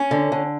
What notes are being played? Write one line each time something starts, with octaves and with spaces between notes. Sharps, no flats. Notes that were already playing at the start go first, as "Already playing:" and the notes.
Already playing: C#4
D3
D3